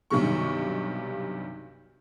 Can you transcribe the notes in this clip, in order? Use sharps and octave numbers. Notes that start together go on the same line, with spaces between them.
B1 G2 C3 D#3 C#6